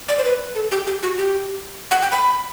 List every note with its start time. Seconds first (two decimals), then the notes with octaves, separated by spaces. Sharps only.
0.08 D5
0.18 C5
0.24 B4
0.55 A4
0.71 G4
0.87 G4
1.03 F#4
1.18 G4
1.91 F#5
2.02 G5
2.12 B5